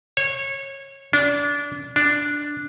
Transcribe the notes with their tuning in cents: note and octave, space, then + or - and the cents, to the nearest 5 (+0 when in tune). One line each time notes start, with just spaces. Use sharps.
C#5 -20
D4 -25
D4 +0